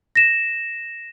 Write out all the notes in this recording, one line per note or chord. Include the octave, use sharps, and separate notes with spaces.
A#6 E7